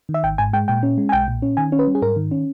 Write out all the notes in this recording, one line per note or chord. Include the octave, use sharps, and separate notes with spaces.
D#3
E5
G#1 G5
G#2 G#5
G#3 G5
A#2 G5
C#4
G#3
G#5
B1 G5
A#2
C#4
D#3 G#5
C#4
B4
G3
G#4
G#2 A#4
D#3
C#4